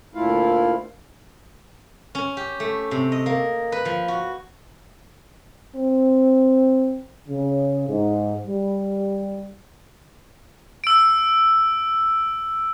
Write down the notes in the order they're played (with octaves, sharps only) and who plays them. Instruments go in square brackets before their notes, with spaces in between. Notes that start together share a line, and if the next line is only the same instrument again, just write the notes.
[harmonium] D2 A#2 A3 E4 F4 F5
[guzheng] C#4
G4
A3
C3
D#5
A#3
B4
F3
F#4
[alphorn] C4
[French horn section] C#3
G#2
G3
[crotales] E6 D7